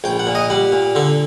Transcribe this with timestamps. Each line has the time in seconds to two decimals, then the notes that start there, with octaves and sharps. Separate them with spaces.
0.04 A#1 G5
0.19 F#5
0.27 A#2
0.35 D#5
0.50 G3 F#5
0.72 A#2
0.95 D3 A4